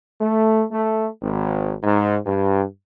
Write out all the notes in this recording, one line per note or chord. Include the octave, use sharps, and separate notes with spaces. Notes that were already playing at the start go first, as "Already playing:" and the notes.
A3
A3
G#1
G#2
G2